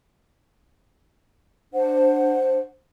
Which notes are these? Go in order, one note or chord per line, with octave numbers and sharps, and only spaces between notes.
D4 C5 F#5